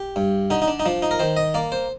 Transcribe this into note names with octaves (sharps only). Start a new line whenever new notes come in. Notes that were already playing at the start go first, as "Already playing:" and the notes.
Already playing: G4
G2
D3 D#4
D#4
D4
D#4
F3 D4
D#4
A#4
D#3 C5
D#5
A#3 D5
C5